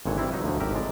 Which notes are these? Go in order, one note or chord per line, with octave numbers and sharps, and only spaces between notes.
G#1 A#2 D3 C#5
E3 G3 C4 E4
F#3 D#4 F#4 B4
D2 F3 F#3
G#1 A2 G4 A#4 E5
A2 G#3 D5 A#5